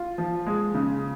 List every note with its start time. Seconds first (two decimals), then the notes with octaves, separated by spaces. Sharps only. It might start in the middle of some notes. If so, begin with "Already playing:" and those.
Already playing: F4
0.18 F3
0.46 G#3
0.74 C#3